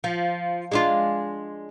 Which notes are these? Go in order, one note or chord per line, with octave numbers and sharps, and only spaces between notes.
F3
G#3 D4 F4